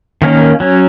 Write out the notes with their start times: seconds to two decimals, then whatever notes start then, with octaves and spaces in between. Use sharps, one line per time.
0.22 D#3 A#3 C#4
0.60 F#3 C#4